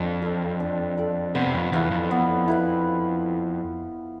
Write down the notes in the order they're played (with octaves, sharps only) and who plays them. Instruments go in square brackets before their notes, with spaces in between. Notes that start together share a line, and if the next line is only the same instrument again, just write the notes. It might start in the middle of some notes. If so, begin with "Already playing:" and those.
Already playing: [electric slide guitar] F2 [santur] D4
[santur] A4 D5 F5
D4
A4 D5 F5
[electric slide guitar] C3 [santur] B3
[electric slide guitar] F2
[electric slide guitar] E2 [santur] E4 B4 F5
[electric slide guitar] F2
[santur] B3
E4 B4 F5